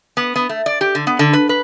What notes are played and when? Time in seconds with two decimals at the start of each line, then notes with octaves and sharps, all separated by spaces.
0.17 B3
0.36 B3
0.49 A3
0.66 D5
0.81 G4
0.95 D3
1.07 B3
1.19 D3
1.33 B4
1.49 B4